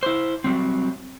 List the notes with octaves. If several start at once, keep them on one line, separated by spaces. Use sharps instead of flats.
E4 C5
F#3 G3 C4